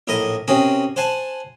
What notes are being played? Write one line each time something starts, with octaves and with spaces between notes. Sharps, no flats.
A#1 A2 A#4 D#5
C3 C4 C#4 F#4 G#4 A#4
C5 F#5 G#5 A5